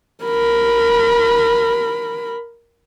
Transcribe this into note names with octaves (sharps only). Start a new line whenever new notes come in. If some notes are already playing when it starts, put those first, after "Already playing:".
A#4 B5